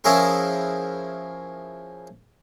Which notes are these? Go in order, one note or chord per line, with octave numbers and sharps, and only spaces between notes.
F3 C#4 E4 G#4 A#4